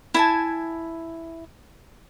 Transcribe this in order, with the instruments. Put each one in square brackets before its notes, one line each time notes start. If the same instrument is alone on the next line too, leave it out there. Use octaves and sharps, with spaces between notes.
[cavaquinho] E4 G#5 A5